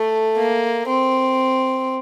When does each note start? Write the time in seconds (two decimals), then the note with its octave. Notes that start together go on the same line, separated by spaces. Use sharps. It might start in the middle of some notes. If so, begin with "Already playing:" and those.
Already playing: A3
0.37 A#3
0.88 C4